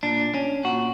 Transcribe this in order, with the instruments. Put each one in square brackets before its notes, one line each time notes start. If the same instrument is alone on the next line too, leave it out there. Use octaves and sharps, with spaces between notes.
[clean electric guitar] A#2 D4
C#4
A#2 F#4